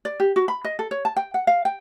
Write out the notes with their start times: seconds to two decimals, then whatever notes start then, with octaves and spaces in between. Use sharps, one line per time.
0.05 D5
0.20 G4
0.36 F#4
0.48 B5
0.64 D#5
0.79 A4
0.91 C#5
1.05 A5
1.16 G5
1.34 F#5
1.47 F5
1.65 G5